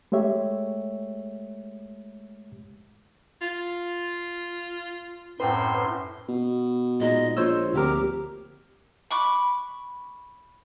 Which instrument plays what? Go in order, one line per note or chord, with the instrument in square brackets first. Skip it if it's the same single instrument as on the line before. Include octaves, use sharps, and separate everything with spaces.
[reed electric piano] G#3 A3 G4 C#5 E5
[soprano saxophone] F4
[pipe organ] F#2 A2 C6 [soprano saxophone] C4 [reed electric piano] B4 G5
[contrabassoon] B2
[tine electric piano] A#2 G#3 D#4 [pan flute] D#5
[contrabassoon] A#1 [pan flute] F4 [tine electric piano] C5 C#5 E6
[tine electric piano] D2 C4 A#4 [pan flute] G4
[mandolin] B5 C#6 D6 F#6